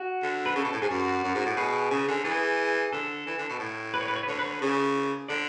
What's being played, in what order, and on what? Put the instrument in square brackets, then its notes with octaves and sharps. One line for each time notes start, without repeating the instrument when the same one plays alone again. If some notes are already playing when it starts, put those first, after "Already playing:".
Already playing: [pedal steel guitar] F#4
[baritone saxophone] D3
[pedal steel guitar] B4
[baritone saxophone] C#3 [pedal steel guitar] A4
[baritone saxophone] B2
A2
[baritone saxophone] G#2 [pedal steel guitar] G#4
[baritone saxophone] F#2 [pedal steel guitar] F#4
[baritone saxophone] F#2
G#2
A2
[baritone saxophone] B2 [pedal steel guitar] G#4
[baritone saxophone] C#3
D3
[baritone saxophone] E3 [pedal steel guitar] G#4
[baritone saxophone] D3 [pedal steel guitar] A4
[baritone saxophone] E3
D3
B2
A2
[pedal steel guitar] B4
C#5
B4
C#5
B4
[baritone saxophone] D3 [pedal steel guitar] C#5
[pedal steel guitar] B4
C#5
B4
[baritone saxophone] C#3
[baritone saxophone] D3 [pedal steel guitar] D5